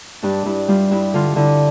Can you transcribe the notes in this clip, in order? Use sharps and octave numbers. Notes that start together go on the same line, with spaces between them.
G2 D4
G2 E4
G3 F4
G2 E4
D3 F4
D3 E4